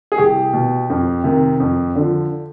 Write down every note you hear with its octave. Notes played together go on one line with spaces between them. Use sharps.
G#4
C2 G4
B2
F2
C3 D#3
F2
D3 F3